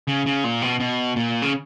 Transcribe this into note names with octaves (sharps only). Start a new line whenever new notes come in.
C#3
C#3
A#2
B2
B2
A#2
C#3